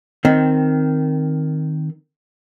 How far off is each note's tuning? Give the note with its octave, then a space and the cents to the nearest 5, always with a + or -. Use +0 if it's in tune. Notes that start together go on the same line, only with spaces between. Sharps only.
D#3 +0 C4 +0